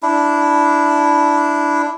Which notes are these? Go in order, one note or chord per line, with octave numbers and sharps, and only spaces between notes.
D4 E4